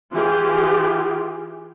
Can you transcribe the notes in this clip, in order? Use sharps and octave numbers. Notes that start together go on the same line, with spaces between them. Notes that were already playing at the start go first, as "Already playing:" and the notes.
E3 F4 G4 G#4